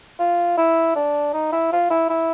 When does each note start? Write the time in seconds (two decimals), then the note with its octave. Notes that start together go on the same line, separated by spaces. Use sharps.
0.19 F4
0.57 E4
0.95 D4
1.33 D#4
1.52 E4
1.72 F4
1.90 E4
2.09 E4